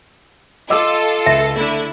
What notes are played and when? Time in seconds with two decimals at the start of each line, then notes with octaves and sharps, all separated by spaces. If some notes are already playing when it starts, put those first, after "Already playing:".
0.70 F4 A4 D#5 D6 E6
1.26 C#2 E5
1.56 D3 A3 E4